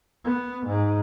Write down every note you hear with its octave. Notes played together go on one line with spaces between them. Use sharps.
B3
G#2